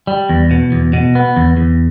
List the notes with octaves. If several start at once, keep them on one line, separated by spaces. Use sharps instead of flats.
G3
E2
B2
E2
B2
B3
E2
E2